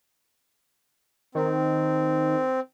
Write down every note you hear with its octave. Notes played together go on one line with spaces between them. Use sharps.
D#3 C4